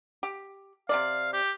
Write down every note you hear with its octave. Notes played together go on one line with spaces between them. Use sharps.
G4
C3 G#3 D5 F5
G4